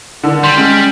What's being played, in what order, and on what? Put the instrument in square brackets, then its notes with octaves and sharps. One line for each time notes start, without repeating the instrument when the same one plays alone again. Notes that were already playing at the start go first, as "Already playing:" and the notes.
[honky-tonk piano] D3 D#3
[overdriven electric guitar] G3 [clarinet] C6
[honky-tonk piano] G#3 [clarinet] C#4